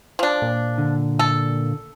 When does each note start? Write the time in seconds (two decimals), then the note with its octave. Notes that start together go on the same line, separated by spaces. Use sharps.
0.19 F3 D4
0.42 A#2
0.78 D3
1.19 A4